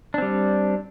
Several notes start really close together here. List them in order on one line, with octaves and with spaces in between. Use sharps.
D4 C4 G3